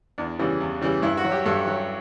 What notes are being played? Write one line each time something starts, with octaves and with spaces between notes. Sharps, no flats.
E2 D4
C#3 E3 G3
E2
C#3 E3 G3
G2 E4
F#4
F#3
G4
G2 A4
F#3